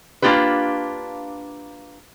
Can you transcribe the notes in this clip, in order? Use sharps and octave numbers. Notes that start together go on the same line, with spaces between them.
A#3 D4 F4 G4 B4